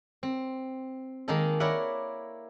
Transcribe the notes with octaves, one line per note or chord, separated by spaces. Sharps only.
C4
D#3 G#3 A#3 D#4 A4
E4 A#4 C#5 D5 E5 F#5